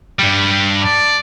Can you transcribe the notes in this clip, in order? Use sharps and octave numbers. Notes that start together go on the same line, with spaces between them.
G2 G3
D5 A5